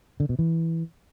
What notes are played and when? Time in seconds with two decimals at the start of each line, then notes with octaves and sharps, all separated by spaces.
0.20 D3
0.29 B2
0.39 E3